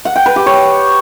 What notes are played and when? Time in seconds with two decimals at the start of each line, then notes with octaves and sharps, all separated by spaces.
0.05 F#5
0.16 G5
0.26 B4
0.36 G4
0.46 C#5